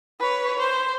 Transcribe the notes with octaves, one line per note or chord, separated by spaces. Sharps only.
B4 C#5
C5